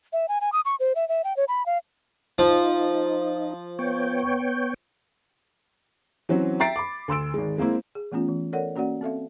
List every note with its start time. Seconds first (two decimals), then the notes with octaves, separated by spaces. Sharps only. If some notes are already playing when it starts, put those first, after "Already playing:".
0.13 E5
0.28 G#5
0.41 G#5
0.53 D#6
0.65 C#6
0.80 C5
0.95 E5
1.09 E5
1.24 G5
1.37 C#5
1.48 B5
1.66 F5
2.38 F3 D#4
3.79 B3 C#5 G5
6.29 E3 F#3 C4 C#4 F#4
6.60 E5 G5 A#5 A6 C7 D7
6.76 B5 D6
7.08 D2 C6 E6 D7
7.34 G#1 G#3
7.58 G#3 A#3 C4 E4
7.95 G#4
8.12 E3 A3 B3 C#4 F4
8.28 E3
8.53 A4 A#4 C#5 D5 F#5
8.76 A#3 C#4 F#4 D5 F#5
9.01 C4 A4 E5 F5